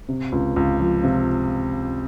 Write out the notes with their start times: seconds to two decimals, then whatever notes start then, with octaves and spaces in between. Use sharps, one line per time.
0.09 C3
0.32 C#2
0.56 C#2
0.80 F3
1.04 C3